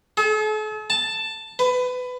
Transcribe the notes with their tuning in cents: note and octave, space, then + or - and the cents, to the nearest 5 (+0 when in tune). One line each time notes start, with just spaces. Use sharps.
A4 -45
A5 +5
B4 +20